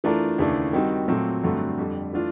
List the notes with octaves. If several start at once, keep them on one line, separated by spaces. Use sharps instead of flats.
E3 A3 D4 F4 A#4
D#2 C#3 E3 A3 D4
D#3 G3 C4 D#4 F#4
A#2 F#3 A3 C4
G2 D3 F#3 A3 C4
F2 D3 G3
E3 A3 D4 F4